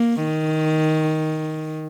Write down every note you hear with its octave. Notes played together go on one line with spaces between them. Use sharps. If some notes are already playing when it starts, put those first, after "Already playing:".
Already playing: A#3
D#3